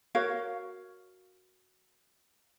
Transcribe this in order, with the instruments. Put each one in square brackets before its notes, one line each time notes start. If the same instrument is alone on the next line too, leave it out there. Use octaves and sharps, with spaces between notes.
[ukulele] F#4 A#4 C#5 F5